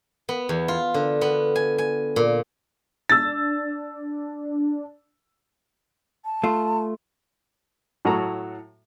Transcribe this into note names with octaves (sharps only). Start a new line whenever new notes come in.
B3
E2
F4
D3
B3
G#5
G#5
A#2
D4 E6 A6
A5
A3 F4
A2 F#3 F#4 A4 A#5